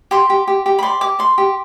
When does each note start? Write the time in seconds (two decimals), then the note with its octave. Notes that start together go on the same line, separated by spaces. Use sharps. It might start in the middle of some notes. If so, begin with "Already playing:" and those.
0.11 G4 C6
0.30 G4
0.47 G4
0.66 G4
0.79 B5
0.83 D5 C6
1.01 G4 D6
1.19 D5 C6
1.38 G4